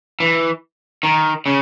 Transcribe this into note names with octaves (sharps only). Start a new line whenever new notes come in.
E3
D#3
C#3